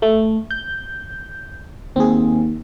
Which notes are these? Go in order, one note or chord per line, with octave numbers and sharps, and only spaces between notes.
A3
G6
D#2 C4 G#4